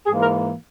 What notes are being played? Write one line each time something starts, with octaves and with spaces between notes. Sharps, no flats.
G#2 E3 A#3 G#4
A#4